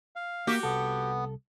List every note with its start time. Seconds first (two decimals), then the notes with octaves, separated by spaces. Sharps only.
0.16 F5
0.47 A#3 F#4 G4
0.63 C2 B3 A4